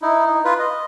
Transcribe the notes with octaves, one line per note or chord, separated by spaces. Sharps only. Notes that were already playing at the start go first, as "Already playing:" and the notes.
D#4 E4
D#4
F4 B4
D#5